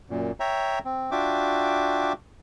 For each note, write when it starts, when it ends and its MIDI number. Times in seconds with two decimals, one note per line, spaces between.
0.10 0.31 42
0.10 0.31 46
0.40 0.79 73
0.40 0.79 76
0.40 0.79 79
0.40 0.79 82
0.85 1.10 60
1.11 2.13 62
1.11 2.13 65
1.11 2.13 66
1.11 2.13 76
1.11 2.13 79
1.11 2.13 86